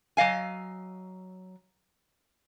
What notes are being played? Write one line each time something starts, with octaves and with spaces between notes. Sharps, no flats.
F#3 D#5 F5 G#5